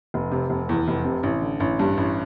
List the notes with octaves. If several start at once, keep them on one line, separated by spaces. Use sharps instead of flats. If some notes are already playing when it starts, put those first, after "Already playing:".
F1
C3
F1
E2
F1
C3
A1
D3
A1
G2
A1